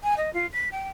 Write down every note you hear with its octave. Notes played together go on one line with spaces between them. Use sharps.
G#5
D#5
F4
B6
G5